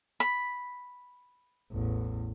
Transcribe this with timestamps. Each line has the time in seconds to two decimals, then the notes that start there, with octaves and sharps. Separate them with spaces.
0.20 B5
1.72 A1 E2